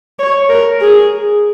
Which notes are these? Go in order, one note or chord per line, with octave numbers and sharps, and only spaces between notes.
C#5
A#4
G#4